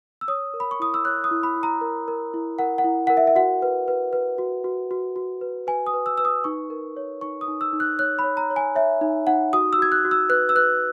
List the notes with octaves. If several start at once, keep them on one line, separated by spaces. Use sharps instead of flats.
E6
C#5 D#6
A#4
B5
C#6
E4 D#6
E6
C#5 F#6
D#6
E4
B5
E4
A#5
A#4
A#4
E4
A#4 F#5
F#5
E4
A#4 F#5
E5
E5
F#4 F#5
B4
B4
B4
F#4
F#4
F#4
F#4
B4
B4 G#5
D#6
B4
E6
B4 E6
D#6
D#4 C#6
A#4
C#5
D#4 C#6
D#6
D#4
E6
D#4
F#6
C#5 F#6
B5
C#5
A#5
C#5
G#5
C#5 E5
D#4
D#4 F#5
F#4 D#6
E6
F#4 G#6
F#6
F#4
E6
B4 F#6
E6
B4 F#6